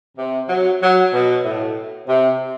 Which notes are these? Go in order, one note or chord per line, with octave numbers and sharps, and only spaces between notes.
C3
F#3
F#3
B2
A2
C3